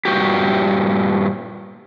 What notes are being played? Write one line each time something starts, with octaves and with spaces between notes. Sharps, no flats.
G2 A#2 F3 F#4 G4